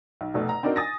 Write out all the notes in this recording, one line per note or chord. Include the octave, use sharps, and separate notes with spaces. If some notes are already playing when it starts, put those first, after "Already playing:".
B1
F1 B2 A3
A#5
C4 D4 D#4 F#4 A#4
G#5 D#6 A6 A#6